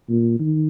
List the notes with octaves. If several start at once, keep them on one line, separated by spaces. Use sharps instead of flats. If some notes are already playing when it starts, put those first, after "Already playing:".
A#2
D#3